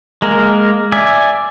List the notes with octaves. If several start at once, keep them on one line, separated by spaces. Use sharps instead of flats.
G#3 A#3 A#4
D5 E5 G#5